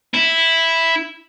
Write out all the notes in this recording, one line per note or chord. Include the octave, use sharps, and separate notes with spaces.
E4